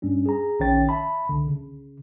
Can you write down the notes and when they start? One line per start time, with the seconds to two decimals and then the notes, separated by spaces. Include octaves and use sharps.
0.02 G2 G3 C#4 D4
0.26 G#4 A#5
0.60 A#1 D#3 C#4 C#5 G5 A6
0.89 E5 A5 B5
1.29 C2 D3
1.47 C#3